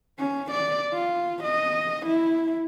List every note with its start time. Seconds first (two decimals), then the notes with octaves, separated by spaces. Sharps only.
0.19 C#4
0.51 D5
0.93 F4
1.43 D#5
2.06 E4